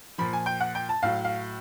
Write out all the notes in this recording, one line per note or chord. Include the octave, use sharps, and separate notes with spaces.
A#2 F3 B5
G#5
G5
F#5
G5
A5
A2 F#3 F5
F5